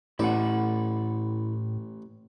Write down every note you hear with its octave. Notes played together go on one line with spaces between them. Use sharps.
A1 A2 E4 A4 D5 F#5